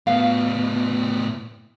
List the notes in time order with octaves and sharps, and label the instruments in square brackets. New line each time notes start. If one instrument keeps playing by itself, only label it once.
[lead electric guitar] A2 B3 [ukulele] F5